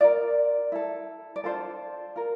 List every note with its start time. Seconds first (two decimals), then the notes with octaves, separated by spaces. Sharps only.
0.01 F4 A#4 D5
0.72 E4 A4
1.36 D5
1.44 D4 F4 A4 C5
2.16 F4 A#4